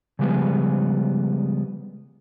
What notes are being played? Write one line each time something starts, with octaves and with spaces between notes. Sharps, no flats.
C#3 F3 G3 G#3 B3